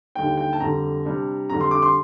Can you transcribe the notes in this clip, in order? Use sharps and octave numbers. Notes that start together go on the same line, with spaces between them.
D#2 D3 G3 A#3 G5
G5
A5
F2 D3 G3 A#5
C3 G3 D4
F2 D3 G3 A#5
C6
D6
C6